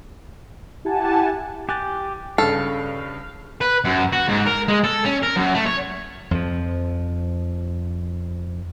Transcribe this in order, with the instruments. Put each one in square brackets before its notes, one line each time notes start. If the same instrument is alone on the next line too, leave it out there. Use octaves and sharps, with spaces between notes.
[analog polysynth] E4 G4 F#5 G#5 A5
[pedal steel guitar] G4 [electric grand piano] G#5 F#6 A6
[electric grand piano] G2 C#3 [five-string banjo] A4 [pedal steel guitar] F5
[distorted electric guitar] B4
F#2
F#4
G#2
A#4
G#3
A4
C#4
A#4
F#2
A3
C#5
[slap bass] F2 F3